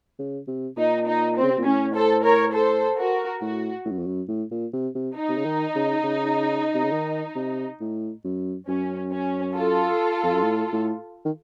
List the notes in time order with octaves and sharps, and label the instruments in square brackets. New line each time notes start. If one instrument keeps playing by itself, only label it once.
[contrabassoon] C#3
C3
[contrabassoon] A#2 [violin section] D#4
[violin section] D#4
C4
[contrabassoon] C#3
C3
A#2
[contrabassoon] A2 [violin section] C#4
[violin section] A4 C5
A#4 C#5
A4 C5
F#4 A#4
[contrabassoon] A2 [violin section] F#4
[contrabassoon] A2
F#2
F2
F#2
A2
A#2
C3
C3
[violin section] D#4
[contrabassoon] C3
C#3
D#3
C#3
C#3
C3
C#3
D#3
C3
A2
F#2
[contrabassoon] F#2 [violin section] C#4
[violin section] C#4
F4 A4
[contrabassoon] F2
F#2
A2
A2
D#3